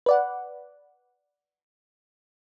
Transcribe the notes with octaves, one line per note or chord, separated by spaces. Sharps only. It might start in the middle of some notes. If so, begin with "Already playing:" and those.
B4 D5 F#5